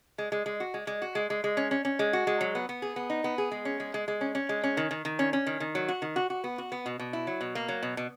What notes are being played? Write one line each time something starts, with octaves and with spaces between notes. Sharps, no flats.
G#3
G#3
G#3
F#4
G#3
G#3
F#4
G#3
G#3
G#3
C#4
C#4
C#4
G#3
F#4
G#3
F#3
B3
B3
G#4
B3
D#4
B3
G#4
G#3
C#4
G#3
G#3
G#3
C#4
C#4
G#3
C#4
D#3
D#3
D#3
C#4
C#4
D#3
D#3
F#3
F#4
D#3
F#4
F#4
B3
F#4
B3
B2
B2
E4
F#3
B2
A#3
F#3
B2
B2